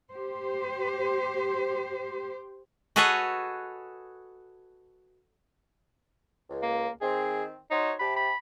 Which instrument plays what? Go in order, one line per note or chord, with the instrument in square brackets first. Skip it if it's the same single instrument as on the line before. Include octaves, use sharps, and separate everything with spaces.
[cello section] G4 C5
[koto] F#4 G#4 A4 B4 C#5 D#5
[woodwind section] C#2
[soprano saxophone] A#3
[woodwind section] D#3 C4 [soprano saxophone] G#4
[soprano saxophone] D#4 [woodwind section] F#4 C5 C#5
[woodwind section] C3 G4 A5 [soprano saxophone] B5
[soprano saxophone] B5